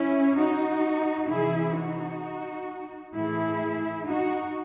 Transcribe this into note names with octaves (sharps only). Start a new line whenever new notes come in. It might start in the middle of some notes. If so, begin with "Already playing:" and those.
Already playing: C#4 E4
D#4 F#4
C3 E3 E4 G#4
D#4 F#4
A2 E3 E4 G#4
D#4 F#4